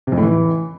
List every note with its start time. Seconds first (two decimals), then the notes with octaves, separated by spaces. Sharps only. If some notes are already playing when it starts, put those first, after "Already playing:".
0.07 C3
0.12 F2
0.17 A2
0.23 E3